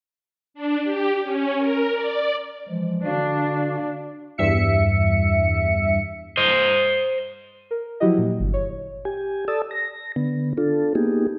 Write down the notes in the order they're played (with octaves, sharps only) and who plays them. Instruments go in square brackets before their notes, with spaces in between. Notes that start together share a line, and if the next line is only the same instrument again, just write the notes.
[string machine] D4
G4
C#4
A#4
D5
[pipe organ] E3 F3 G#3
[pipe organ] D3 F#4 F5 [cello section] D4
[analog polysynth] E2 G2 E5 C#7
[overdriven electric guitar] C5 D#5
[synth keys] A#4
F3 F#3 E4 F#4 G4 D#5
A#2
G1
C#5
[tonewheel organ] G4 G#5
A4 D5 A5 D#6 E6
A#6
D3 B3
D4 F4 A4
A#3 B3 D#4 G4 G#4